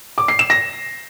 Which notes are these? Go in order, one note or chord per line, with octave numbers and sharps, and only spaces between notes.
D6
C7
E7
A#6